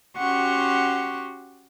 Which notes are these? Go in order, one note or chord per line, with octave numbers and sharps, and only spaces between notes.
C#4 F#4 G4 F#5 C6 C#6